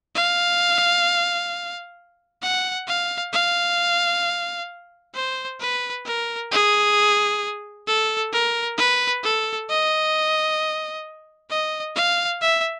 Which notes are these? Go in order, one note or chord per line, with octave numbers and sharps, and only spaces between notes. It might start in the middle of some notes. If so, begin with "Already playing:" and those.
F5
F#5
F5
F5
C5
B4
A#4
G#4
A4
A#4
B4
A4
D#5
D#5
F5
E5